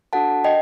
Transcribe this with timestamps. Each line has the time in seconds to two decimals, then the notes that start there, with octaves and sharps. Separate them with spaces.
0.13 D4 F#4 A4 F#5 A5
0.44 D#5 G5